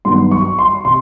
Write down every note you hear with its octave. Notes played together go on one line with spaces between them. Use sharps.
G2 D#3 F#3 B3 C6
C#6
C6
C3 C6